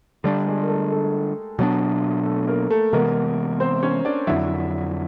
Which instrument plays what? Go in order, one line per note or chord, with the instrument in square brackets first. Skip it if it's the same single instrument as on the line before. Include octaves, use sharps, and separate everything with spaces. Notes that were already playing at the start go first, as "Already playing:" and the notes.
[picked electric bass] D3 G3 A#3 D4 [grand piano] G4
[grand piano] G#3 G#4
A#4
A3 A4
A3 A4
[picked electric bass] B2 F#3 B3 D4
[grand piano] A3 A4
A#3 A#4
A3 A4
[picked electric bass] C3 E3 G#3 B3 [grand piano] A#3 A#4
[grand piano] C4 C5
C#4 C#5
D4 D5
[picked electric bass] F2 D3 F#3 [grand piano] E4 E5